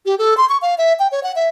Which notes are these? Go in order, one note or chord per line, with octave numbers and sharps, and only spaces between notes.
G4
A4
C6
C#6
F5
E5
G5
C#5
F#5
E5